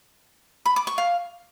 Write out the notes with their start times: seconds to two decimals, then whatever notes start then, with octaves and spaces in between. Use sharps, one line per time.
0.65 B5
0.76 D6
0.87 C#6
0.98 F5